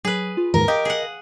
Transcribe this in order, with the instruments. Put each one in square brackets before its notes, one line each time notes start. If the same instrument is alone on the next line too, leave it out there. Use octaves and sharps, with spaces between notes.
[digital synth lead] F#3 [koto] G#4 B4
[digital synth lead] F4
[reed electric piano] D#2 G#2 [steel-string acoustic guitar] A#4
[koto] G4 [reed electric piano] D#5 [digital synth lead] F5
[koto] G#4 F#5